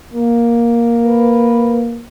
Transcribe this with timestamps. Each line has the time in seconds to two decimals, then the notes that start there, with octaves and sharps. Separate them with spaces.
0.14 A#3
1.06 B4